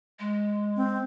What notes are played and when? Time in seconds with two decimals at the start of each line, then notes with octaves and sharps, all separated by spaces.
0.19 G#3
0.76 C4